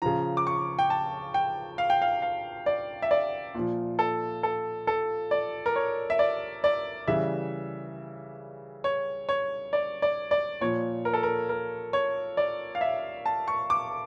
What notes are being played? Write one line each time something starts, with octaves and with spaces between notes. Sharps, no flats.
C#3 F3 A#5
D6
C#6
G5
A5
G5
F5
G5
F5
F5
D5
E5
D5
A#2 F3
A4
A4
A4
D5
A#4
C#5
E5
D5
D5
C#3 E3 G3 E5
C#5
C#5
D5
D5
D5
A#2 F3 C#5
A#4
A4
A#4
A#4
C#5
D5
F5
E5
A5
C#6
D6